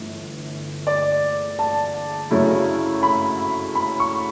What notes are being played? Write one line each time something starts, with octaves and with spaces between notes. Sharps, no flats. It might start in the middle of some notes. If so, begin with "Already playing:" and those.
Already playing: G1 G2 E3 A3
D5
A5
F#2 C#3 F#3 A3 E4
B5
B5
C#6